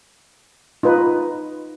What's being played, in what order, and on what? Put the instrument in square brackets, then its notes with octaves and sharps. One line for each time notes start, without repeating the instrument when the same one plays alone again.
[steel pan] D#4 F4 B4